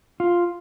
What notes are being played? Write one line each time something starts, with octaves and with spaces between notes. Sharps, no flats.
F4